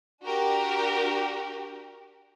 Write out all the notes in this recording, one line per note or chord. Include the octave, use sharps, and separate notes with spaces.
D4 F#4 G4 A#4